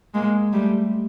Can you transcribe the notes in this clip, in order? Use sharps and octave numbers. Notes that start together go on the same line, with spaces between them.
G#3 A#3
G3 A3